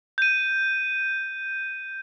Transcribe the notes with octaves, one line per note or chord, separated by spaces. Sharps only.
G6 D#7